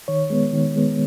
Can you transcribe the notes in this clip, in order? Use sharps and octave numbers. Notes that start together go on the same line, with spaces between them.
D#3 C#5
G#3 B3
D#3
G#3 B3